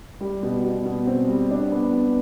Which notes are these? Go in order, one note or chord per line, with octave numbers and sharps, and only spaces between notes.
G3
B2
B2
B2
C4
G3
D4
B3
B3